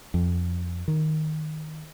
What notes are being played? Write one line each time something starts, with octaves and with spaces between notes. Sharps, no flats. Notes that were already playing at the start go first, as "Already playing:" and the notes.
F2
D#3